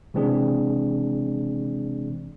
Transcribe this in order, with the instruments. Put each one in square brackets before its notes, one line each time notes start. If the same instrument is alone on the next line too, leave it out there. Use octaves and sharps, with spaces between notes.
[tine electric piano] C3 E3 G#3 C4 D4 G#4